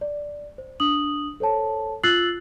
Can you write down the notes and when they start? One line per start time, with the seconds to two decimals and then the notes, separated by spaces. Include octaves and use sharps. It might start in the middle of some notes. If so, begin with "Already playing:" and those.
0.01 D5
0.58 C5
0.80 D4 D#6 F#7
1.40 A4 C5 C#5 A5
2.04 F4 E6 F#6 A6 C7 F#7